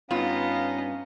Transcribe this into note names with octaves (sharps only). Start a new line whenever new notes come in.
G2 B3 C#4 D#4 F4 F5